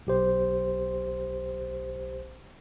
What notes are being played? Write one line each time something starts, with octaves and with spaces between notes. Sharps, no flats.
B1 G4 C5